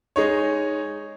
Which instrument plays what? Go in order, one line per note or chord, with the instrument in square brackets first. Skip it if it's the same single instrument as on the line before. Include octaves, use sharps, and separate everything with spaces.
[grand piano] G#3 D#4 C#5